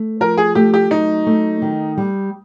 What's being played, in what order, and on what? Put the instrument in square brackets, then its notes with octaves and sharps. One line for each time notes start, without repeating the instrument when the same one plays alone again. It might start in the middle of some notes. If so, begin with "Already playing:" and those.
Already playing: [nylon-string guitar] A3
[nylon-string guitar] F3 [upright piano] A#4
[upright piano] G#4
[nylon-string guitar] A3 [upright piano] G4
[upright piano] G4
[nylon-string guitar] F#3 [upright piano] D#4
[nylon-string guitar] A3
D#3
G3